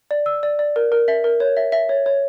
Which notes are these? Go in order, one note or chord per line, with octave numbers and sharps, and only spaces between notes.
D5
E6
D5
D5
A#4
A#4
E5
A#4
C#5
E5
E5
C#5
C#5